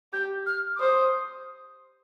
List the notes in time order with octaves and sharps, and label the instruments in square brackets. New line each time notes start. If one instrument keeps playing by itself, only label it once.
[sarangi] G4 [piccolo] G6
[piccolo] F6
D6
[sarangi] C5 [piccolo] D#6